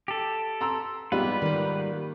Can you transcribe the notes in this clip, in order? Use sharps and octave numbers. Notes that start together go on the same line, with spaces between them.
G4 A4
A#5 C6 E6
G#2 G3 B3 D#4 F4 B4
D#3 A#3